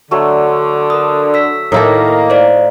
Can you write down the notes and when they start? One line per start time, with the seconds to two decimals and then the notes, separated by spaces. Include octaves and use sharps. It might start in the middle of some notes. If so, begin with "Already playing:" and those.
0.11 D3 F#3 A3 C#5
0.90 A#4 D#6
1.34 E6 B6
1.72 A2 D#3 A#3 D#4 E4 A4
2.30 C5 D5 F5